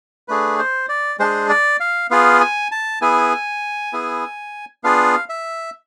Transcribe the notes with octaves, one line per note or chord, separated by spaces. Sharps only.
A3 D4 G#4 B4
C5
D5
G#3 D4 G#4 C5
D5
F5
B3 F4 G#4 F5
G#5
A5
B3 E4 G#4 G#5
B3 E4 G#4
B3 D4 F4 G#4 F5
E5